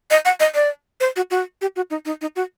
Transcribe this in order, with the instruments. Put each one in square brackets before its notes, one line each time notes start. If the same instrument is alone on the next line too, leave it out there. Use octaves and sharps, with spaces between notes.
[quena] D#5
F#5
D#5
D5
C5
F#4
F#4
G4
F#4
D#4
D#4
D#4
F#4